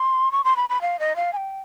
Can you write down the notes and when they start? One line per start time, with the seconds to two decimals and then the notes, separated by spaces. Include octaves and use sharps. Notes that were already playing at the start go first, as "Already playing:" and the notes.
Already playing: C6
0.32 C#6
0.44 C6
0.56 B5
0.69 B5
0.81 F5
0.99 D#5
1.16 F5
1.33 G#5
1.37 G5